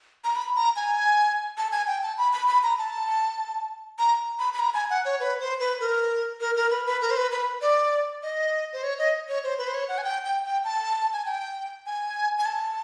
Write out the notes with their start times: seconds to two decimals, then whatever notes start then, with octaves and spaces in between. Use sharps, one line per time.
0.24 A#5
0.36 B5
0.56 A#5
0.76 G#5
1.58 A5
1.72 G#5
1.87 G5
2.03 A5
2.18 B5
2.33 B5
2.48 B5
2.63 A#5
2.78 A5
3.99 A#5
4.39 B5
4.54 B5
4.59 A#5
4.74 G#5
4.90 F#5
5.05 C#5
5.20 B4
5.40 C5
5.60 B4
5.80 A#4
6.40 A#4
6.56 A#4
6.71 B4
6.86 B4
7.01 A#4
7.11 C5
7.17 B4
7.31 B4
7.62 D5
8.23 D#5
8.73 C5
8.83 C#5
8.99 D#5
9.28 C#5
9.44 C5
9.58 B4
9.67 C5
9.74 C#5
9.88 F#5
9.98 G#5
10.04 G5
10.25 G5
10.44 G5
10.64 A5
11.13 G#5
11.25 G5
11.86 G#5
12.38 G#5
12.46 A5